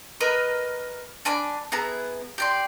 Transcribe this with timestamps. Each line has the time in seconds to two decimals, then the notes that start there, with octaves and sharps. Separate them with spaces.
0.20 A#4 B4 D#5 B5
1.25 D4 G#5 B5 D6
1.72 B3 E4 G#4 A#5
2.38 G4 D5 C6